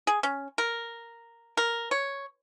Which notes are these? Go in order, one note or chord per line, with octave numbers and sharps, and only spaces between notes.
G#4
C#4
A#4
A#4
C#5